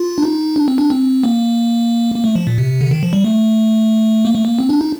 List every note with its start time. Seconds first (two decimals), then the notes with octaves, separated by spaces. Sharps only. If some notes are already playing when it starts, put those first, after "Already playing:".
Already playing: F4
0.18 D4
0.23 D#4
0.56 D4
0.68 C4
0.78 D4
0.90 C4
1.23 A#3
2.15 A#3
2.24 A3
2.35 F3
2.47 A#2
2.58 C3
2.81 D3
2.91 D#3
3.03 F3
3.13 G3
3.25 A3
4.25 A#3
4.35 A3
4.45 A#3
4.59 C4
4.69 D4
4.81 D#4